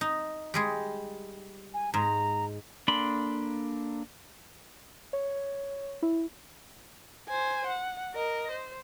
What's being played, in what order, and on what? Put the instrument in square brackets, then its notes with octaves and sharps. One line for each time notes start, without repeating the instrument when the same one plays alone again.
[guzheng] D#4
G3 G#3 G#4
[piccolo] G#5
[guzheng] G#2 [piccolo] A#5
[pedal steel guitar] A#3 D4 A4 B5 C6
[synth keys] C#5
E4
[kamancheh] C5 G#5
F#5
A#4 D#5
C5